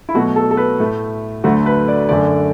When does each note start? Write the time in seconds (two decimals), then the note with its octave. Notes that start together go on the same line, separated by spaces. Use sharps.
0.09 E4
0.14 B2 F#3 A3 F#4
0.36 A4
0.51 A4
0.57 B4
0.80 A2 A3
1.44 D2 D3 F#3 A3 F#4
1.66 B4
1.88 D5
2.09 F#2 D3 A3 D5